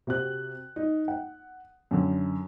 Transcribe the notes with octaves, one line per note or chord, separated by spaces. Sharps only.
C3 F#4 F#6
D#4
F#5
F#2 D3